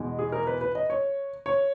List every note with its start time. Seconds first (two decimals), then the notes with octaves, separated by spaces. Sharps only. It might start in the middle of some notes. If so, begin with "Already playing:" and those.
Already playing: E2 B2 G#3
0.19 G#4
0.32 A#4
0.47 B4
0.61 B4
0.75 D#5
0.90 C#5
1.46 C#5